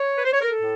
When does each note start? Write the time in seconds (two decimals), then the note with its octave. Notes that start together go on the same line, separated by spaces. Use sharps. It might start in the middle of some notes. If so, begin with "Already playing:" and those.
Already playing: C#5
0.17 B4
0.25 C5
0.33 C#5
0.42 A#4
0.50 A4
0.59 A2